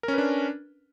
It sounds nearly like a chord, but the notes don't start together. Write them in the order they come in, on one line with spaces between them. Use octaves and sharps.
A#4 C#4 B4 D4